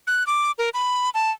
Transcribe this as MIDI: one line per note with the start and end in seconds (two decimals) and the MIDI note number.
0.07 0.26 90
0.27 0.51 86
0.58 0.69 70
0.74 1.10 83
1.14 1.31 81